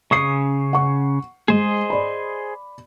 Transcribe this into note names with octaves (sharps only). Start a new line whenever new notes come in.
C#3 C#4 C#6 D#6 C7
F#5 C#6
G#3 G#4 C5 D#5
D5 B5